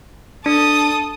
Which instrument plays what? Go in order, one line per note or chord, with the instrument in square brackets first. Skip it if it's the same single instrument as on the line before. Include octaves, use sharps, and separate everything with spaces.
[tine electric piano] D4 [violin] A4 D#6